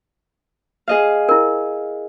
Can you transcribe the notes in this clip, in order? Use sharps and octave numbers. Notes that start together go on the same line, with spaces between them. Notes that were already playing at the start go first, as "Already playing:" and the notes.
G#4 D#5 F5
E4 A#4